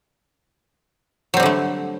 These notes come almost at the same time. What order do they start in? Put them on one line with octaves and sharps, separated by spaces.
F#3 C4 G3 D3 A3